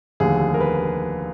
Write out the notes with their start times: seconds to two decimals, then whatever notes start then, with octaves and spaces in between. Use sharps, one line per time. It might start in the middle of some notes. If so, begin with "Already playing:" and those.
0.20 F1 D#2 D3 G#4
0.54 A#4
0.60 B4